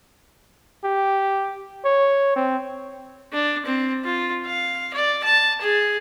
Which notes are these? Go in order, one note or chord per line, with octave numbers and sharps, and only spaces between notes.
G4
C#5
C4
D4
C4
F4
F5
D5
A5
G#4